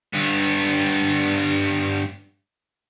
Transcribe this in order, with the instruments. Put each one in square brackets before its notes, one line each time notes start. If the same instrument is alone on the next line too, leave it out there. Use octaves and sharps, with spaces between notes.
[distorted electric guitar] G2 B3